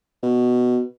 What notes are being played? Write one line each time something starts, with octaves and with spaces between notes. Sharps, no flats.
B2